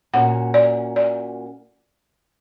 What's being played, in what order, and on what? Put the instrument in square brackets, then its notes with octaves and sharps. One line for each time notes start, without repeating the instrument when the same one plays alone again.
[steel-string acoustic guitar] A#2 A#3 C#4 F#4 [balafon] F#5
[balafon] D5
D5